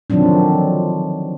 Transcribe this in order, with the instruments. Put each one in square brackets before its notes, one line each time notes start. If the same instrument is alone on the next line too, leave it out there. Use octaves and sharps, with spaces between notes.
[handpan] D3 D#3 F3 F#3 C4 D4